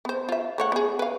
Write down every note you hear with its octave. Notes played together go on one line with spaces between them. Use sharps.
B3 C5
F4 E5
A3 C#5 F#5
B3 G#4
B4 F5